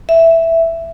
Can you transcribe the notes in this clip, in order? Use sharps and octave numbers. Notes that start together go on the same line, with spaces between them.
E5